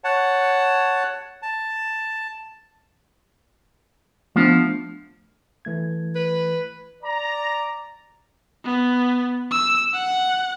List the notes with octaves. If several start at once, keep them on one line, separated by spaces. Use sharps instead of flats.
C#5 F#5 A5
A5
F3 A3 B3 D4
E3 A3 G#6
B4
D5 A#5
B3
E6
F#5